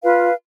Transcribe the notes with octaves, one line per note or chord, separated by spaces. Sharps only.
F4 B4 F5